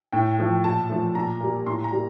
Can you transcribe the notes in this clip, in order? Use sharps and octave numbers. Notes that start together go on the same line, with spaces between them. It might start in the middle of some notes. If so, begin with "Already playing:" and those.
A2 G5
F3 A3
A#2 A5
F3 A3
A#2 A#5
G3 A#3
A2 C6
A#5
G3 A#3